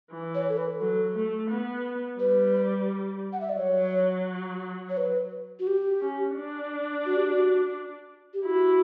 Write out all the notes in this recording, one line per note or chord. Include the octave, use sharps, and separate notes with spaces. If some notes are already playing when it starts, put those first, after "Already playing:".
E3
C#5
A4
B4
F#3 A4
A3
B3
G3 B4
F#5
E5
D5
F#3 C#5
C#5
B4
F#4
G4
C#4
D4
F#4
G4
F#4
G4
E4 F#4